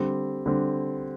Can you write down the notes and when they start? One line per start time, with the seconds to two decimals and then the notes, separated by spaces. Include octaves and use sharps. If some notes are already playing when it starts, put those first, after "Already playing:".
Already playing: D3 G3 C4
0.46 D3 G3 C4